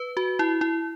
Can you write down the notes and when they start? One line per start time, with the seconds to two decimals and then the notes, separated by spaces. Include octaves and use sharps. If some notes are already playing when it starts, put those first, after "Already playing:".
Already playing: B4
0.17 F#4
0.39 E4
0.61 E4